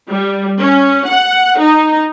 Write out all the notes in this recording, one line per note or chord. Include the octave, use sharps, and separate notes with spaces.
G3
C#4
F#5
D#4